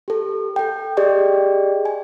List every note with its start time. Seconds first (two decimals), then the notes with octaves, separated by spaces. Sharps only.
0.08 G4 A4
0.56 A4 G5
0.97 G4 G#4 D5 D#5 G5
1.85 G#5